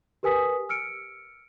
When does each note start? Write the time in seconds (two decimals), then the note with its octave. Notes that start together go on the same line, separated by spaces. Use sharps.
0.23 G4 A#4 B4 G#5 D#6 B6
0.69 E6 F6 C#7 D7